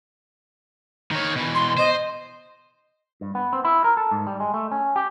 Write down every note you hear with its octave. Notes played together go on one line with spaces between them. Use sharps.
D#3 C#5
B2 E3
C6
C5 D#5
G2
B3
C4
E4
A#4
A4
G#2
G3
G#3
A3
C#4
G4